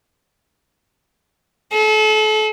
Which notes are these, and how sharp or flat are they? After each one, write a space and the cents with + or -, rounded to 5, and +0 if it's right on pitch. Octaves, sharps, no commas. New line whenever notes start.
A4 -35